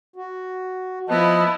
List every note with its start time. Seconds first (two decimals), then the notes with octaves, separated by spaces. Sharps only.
0.16 F#4
1.09 F3 B3 E4 D#5 A5